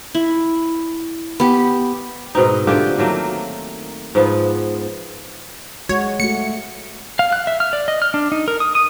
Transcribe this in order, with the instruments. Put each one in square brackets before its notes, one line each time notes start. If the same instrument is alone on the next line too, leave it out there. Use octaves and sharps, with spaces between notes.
[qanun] E4
B3 G4
[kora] G#2 B2 C4 D#4
D3 A3 F4 G4
D#3 F#3 A3 A#3
G#2 F3 B3
[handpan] G#3 F#4 [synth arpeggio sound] C#5
[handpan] A3 F#4 [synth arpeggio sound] C#7
[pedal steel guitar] F5
F#6
E5
F6
D5
D#5
F6
D4
D#4
A#4
D#6
D#6